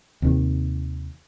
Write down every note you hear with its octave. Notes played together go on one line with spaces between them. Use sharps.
D#2 C3 D#3